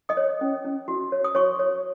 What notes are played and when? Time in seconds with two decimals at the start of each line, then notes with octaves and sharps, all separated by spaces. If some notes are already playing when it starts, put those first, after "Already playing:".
0.09 D#5 D#6
0.17 C#5
0.41 C#4
0.65 C#4
0.88 F#4
1.12 C#5
1.24 D#6
1.35 F#4 C#5 C#6
1.59 C#5